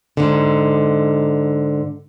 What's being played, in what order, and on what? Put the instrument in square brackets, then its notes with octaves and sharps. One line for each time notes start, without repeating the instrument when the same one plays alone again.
[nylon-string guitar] G#2 D3